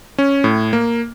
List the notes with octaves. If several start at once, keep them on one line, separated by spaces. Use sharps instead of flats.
C#4
A2
A#3